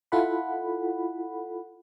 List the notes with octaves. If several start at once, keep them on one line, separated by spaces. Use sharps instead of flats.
E4 F4 A4 F#5 B5